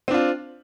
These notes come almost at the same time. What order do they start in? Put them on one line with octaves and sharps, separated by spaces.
C4 D4 F4